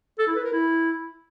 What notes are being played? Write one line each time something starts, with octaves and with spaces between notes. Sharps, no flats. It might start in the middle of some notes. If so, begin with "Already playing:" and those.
A4
E4
B4
A#4
E4